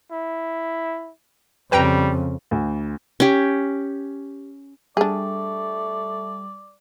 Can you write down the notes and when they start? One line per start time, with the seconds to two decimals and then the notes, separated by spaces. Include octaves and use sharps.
0.12 E4
1.72 F2 C#3 G3 B4 G5 A#5
2.51 D2
3.20 C#4 G4
4.97 G3 A3 D4 G#4 D5